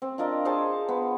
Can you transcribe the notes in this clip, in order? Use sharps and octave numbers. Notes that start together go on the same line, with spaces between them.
C4
D4 F4 A#4 D#5
G#4 C5 C#5 A5
B3